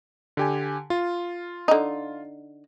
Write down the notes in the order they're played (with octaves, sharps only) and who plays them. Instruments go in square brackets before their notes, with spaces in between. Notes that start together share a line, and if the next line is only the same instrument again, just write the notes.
[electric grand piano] D3 G4 G#5
F4
[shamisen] D3 D#4